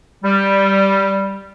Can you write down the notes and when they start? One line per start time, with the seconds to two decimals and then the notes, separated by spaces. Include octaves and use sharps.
0.23 G3